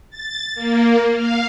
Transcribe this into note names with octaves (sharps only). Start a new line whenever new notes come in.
A6
A#3
F5